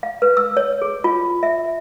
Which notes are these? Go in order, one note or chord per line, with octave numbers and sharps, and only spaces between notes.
F5
B4
E6
C#5
G#4
F4
E5